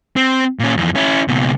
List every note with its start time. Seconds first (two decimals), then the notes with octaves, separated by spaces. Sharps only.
0.16 C4
0.59 A#2 C#4
0.77 F2 E3
0.96 C#4 E4
1.28 C#2 B2